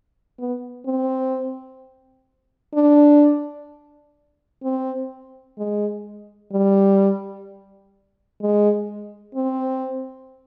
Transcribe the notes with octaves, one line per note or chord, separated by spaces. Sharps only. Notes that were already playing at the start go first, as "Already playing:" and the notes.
B3
C4
D4
C4
G#3
G3
G#3
C4